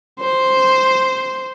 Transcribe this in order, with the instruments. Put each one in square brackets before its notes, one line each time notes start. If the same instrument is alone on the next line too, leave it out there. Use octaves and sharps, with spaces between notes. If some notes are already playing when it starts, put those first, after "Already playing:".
[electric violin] C5